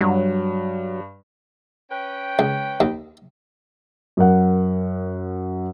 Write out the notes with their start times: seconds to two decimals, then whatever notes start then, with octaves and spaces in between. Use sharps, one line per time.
0.01 G2 F#3
1.90 C#4 B4 G5
2.39 C#2
2.80 D#2
4.17 F#2 A#4 F#5